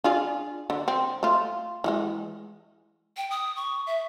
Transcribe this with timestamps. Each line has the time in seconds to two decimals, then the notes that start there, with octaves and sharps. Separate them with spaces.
0.04 D4 F4 G#4
0.70 D3
0.88 C4
1.23 A3 F4
1.84 E3 F3 G#3
3.17 G5
3.30 D#6
3.56 C#6
3.87 E5